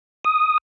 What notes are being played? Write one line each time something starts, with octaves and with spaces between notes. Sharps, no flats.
D#6